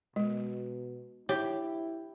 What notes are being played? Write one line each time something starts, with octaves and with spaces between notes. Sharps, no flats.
B2 G#3
E4 G4 C#5